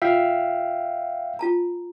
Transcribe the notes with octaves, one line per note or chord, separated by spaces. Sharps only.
F4 E5 F5 G5
F4 A5 A#5